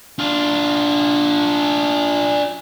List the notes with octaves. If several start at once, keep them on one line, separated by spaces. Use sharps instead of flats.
D4 F4